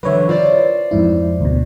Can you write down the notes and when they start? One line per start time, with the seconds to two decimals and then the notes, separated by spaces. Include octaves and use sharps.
0.03 D3 E3 F#3 B4 C#5 E5
0.29 F4 C5 D5
0.91 F2 G#2 E4
1.41 D2 B2